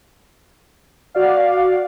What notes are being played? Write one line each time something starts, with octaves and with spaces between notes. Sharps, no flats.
F#4 D5 F5